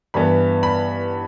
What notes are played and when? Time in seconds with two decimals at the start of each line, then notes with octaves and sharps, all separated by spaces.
0.14 G2 E3 B3 B5
0.63 B5